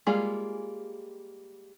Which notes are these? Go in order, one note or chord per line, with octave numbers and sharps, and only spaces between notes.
G3 G#3 A#3 F4 G#4